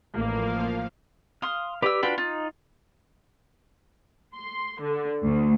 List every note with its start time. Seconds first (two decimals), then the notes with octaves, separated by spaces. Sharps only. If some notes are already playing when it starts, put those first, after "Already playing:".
0.16 A1 F3 A#3 F5
1.42 F5 C6 D#6
1.82 G4 B4 D5 E6
2.03 D4 F4 F#4 B4 G5 B5
2.18 D#4 F4
4.36 C6
4.82 D3
5.24 D2